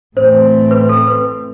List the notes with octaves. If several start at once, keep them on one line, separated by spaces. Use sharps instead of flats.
A2 E3 A3 C4 C5
B4
A4
B4